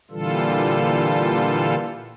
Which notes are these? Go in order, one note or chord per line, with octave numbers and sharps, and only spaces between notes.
A#2 D3 E3 G3 F4 A4